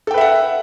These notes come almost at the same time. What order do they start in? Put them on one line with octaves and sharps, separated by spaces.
A4 G5 B4 E5 F#5